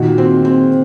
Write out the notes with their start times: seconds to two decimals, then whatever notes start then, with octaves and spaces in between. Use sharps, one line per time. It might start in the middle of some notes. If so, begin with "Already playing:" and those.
Already playing: A#2 D#3 F#4
0.18 C4
0.45 C4